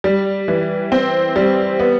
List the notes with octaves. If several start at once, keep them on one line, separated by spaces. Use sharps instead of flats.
G3
E3
C4
G3
B3